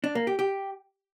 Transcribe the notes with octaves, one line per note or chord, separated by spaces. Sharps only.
D4
A#3
G4
G4